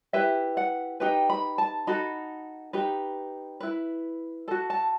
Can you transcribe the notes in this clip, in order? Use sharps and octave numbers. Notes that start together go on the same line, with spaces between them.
E4 G4 B4 E5
F#5
D#4 G4 B4 G5
B5
A5
D#4 F#4 A4 B5
D#4 G4 B4
E4 B4
F#4 A4 A5
A5